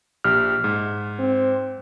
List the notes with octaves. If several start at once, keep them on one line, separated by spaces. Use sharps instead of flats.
A#1 G4 F6
G#2
C4